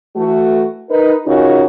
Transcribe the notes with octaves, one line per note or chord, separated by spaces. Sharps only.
E3 A3 F#4
D#4 A#4 B4
C#3 C#4 D#4 F4 F#4 A#4